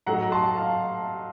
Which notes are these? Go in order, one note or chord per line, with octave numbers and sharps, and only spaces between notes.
A2 F#3 A3 D#4 F#5 A#5
A5 C6
F5 A5